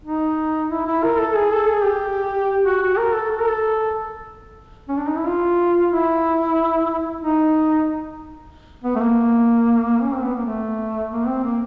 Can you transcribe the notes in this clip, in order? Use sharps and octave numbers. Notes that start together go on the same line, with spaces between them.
D#4
E4
E4
A#4
A4
G#4
A4
G#4
G4
F#4
F#4
A#4
A4
A4
A#4
A4
C#4
D4
D#4
E4
F4
E4
D#4
B3
A3
A#3
C#4
C4
B3
A#3
A3
A#3
C4
A#3